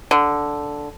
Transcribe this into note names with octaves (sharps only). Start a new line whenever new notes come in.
D3